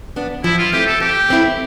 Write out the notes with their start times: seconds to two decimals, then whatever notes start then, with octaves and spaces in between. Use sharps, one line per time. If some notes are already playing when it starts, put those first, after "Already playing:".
0.16 B3 D4
0.44 F3 E4
0.58 F4
0.72 A3 C4 E4 G4
0.87 A4
1.00 F3 G4
1.29 A3 C4 E4